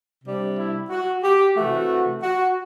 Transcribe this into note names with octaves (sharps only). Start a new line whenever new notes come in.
C3 G3 D4
E4
F#4
G4
C3 E3 A3 F#4
F#4